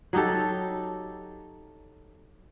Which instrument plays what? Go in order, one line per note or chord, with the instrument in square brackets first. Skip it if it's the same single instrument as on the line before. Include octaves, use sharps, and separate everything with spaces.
[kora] F#3 D#4 G4 A4